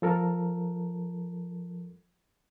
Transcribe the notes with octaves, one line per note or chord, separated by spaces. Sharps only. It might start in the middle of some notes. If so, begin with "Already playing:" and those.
F3 A4 A#4